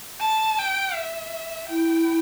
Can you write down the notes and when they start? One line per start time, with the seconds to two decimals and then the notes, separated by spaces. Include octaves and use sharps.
0.20 A5
0.58 G5
0.94 E5
1.69 E4 G5